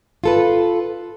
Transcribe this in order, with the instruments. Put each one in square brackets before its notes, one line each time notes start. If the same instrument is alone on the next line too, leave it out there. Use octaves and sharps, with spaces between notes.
[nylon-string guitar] F4 A4 B4